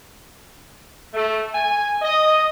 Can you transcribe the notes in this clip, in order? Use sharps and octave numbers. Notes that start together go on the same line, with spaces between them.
A3
G#5
D#5